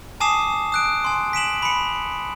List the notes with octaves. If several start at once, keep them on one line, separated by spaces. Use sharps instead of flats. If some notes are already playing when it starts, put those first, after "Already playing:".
G#5 A5 D6 D#6 C7 E7
D#6 F#6 D7
G#5 C6
B6 D7 E7 F#7
B5 C#7